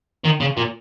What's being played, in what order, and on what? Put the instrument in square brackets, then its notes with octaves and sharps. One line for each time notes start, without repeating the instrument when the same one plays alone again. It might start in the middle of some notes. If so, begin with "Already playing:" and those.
[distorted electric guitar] D#3
C#3
A#2